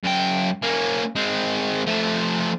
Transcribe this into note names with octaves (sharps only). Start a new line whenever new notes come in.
F#2 G5
A#3 C#4
G#3 C4
F3 A3